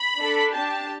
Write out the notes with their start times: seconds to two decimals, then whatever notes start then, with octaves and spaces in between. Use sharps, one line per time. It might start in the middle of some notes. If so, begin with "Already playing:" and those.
Already playing: B5
0.18 D4 A4
0.54 D4 G4 A5